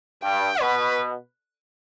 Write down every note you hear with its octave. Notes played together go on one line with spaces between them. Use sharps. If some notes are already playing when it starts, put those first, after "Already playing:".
G2 G5
B2 B4